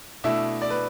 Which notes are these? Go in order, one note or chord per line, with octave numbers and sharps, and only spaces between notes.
B2 A3 D4 E4 E5
D5
B4